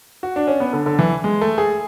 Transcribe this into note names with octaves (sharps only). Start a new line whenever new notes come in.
F#4
D4
C#4
B3
D3
D3
E3
G#3
A3
G#4